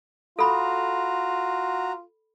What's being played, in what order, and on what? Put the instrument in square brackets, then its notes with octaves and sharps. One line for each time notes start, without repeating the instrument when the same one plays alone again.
[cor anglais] F4 [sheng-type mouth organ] F#4 A#5 [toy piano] A4 B5